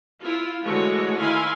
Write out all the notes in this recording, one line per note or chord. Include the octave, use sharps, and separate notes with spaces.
E4 F4
D3 E3 G#3 A3 F#4 C#5
D#3 E4 F5 G#5 B5 C6